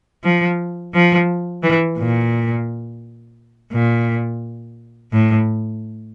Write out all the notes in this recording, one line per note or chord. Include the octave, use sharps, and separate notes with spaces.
F3
F3
E3
A#2
A#2
A2